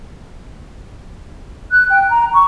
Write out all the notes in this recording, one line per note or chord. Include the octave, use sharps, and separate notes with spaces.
F#6
G5
A#5
C#6